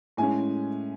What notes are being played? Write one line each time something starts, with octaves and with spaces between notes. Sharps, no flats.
A2 G#3 C#4 G#5